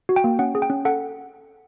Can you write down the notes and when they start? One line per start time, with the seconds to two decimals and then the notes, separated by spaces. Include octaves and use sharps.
0.09 F#4
0.16 G5
0.24 A#3
0.39 C#4 F#5
0.55 G#4
0.62 G5
0.70 C#4
0.85 A4 F#5